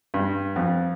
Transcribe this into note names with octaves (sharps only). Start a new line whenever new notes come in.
G2
F2